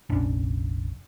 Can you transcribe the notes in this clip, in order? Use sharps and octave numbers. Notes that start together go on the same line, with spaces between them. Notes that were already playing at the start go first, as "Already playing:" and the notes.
F1 A#1 C#4 D4